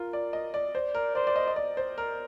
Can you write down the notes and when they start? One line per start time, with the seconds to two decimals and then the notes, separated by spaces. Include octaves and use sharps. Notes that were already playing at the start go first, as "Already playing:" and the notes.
Already playing: F4 A#4
0.13 D5
0.33 D#5
0.54 D5
0.74 C5 D5
0.95 A#4
1.15 C5 D5
1.27 D5
1.36 D#5
1.47 D#5
1.56 D5
1.77 C5
1.98 A#4